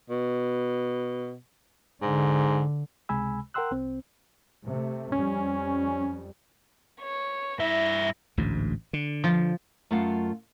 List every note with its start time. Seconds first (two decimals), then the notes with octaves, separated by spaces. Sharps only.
0.10 B2
2.02 G#2 D3
3.09 C#2 C3 G#3 G#5 B5 E6
3.54 A#4 F#5 G5 C6 E6 F#6
3.71 C2 C4
4.66 C3 A3
5.12 F2 G3 C#4
7.02 C#5
7.59 G2 E4 E5 A#6
8.38 A1 D2 G#2
8.93 D3
9.24 F3
9.91 F#2 A3 F4 F5 F#5